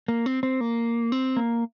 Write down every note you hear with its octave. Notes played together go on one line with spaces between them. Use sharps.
A#3
C4
C4
A#3
C4
A#3